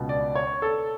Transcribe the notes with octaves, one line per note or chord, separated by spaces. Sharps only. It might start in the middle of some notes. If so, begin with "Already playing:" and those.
Already playing: C#2 B2
D5
C#5
A4